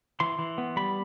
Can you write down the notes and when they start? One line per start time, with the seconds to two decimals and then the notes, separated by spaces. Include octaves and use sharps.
0.20 E3 C6
0.39 E3
0.58 B3
0.76 G3 B5